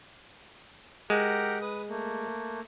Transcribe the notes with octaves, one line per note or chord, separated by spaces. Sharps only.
G#3 G4 A#4 F#5
B4 D#6
A3 A#3